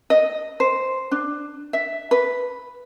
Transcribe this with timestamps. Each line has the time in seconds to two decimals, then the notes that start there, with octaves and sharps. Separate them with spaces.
0.10 D#5
0.60 C5
1.11 D4
1.73 E5
2.11 B4